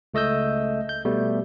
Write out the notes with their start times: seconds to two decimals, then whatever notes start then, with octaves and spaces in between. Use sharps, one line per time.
0.14 C#2 A3 D#5 E6 G6
0.89 G6
1.05 B2 G3 A3 B3